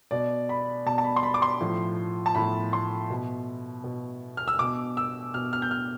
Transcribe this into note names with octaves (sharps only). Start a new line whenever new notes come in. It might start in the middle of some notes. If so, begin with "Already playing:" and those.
B2 D5
B5
B2 A5
A5
B5
C6
B5
D6
C6
A2 F3
A5
A2 F3 B5
C6
B2
B2
F6
E6
B2 D6
E6
B2 F6
F6
G6
F6